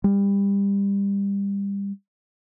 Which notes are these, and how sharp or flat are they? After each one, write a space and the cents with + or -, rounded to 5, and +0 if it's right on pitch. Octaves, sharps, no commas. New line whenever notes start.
G3 +25